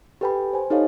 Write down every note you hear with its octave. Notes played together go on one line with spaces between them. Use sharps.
G4 A4 B4 G5 G#5 B5
C5 G#5
D#4 G4 A4 C#5 D#5 F5